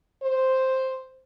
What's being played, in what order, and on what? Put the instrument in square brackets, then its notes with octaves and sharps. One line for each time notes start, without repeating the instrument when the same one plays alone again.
[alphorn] C5